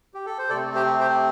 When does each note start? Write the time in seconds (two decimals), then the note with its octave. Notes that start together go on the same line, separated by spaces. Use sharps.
0.14 G4
0.26 A4
0.38 C5
0.50 C3 A3 C4 A4 D5
0.75 G4 C5
1.00 G4 C5